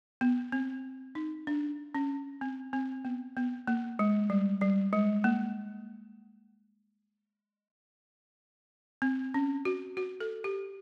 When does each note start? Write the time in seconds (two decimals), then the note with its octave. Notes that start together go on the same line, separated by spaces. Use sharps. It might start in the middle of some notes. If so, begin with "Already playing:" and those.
0.21 B3
0.52 C4
1.15 D#4
1.47 D4
1.95 C#4
2.41 C4
2.73 C4
3.05 B3
3.37 B3
3.67 A#3
3.99 G#3
4.30 G3
4.61 G3
4.93 G#3
5.24 A#3
9.02 C4
9.34 C#4
9.65 F#4
9.97 F#4
10.20 A4
10.44 G4